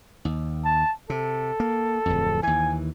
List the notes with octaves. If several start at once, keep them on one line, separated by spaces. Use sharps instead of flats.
D#2
A5
C3 A4
A#3
D1 F2
D#2 E3 G#5